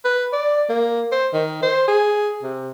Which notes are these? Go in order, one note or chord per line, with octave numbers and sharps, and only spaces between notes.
B4
D5
A#3
C5
D#3
C5
G#4
C3